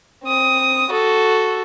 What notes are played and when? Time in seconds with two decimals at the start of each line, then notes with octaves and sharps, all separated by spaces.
0.24 C4 D#6
0.91 F#4 A4